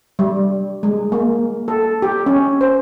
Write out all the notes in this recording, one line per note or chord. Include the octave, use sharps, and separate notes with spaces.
G3
G#3
A#3
A4
G4
C#4
C5